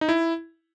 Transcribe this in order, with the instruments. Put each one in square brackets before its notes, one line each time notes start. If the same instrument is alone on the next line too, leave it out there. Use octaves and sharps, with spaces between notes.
[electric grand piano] D#4
E4